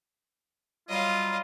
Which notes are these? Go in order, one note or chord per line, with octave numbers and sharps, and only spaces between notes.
F#3 G3 F4 D#5 F5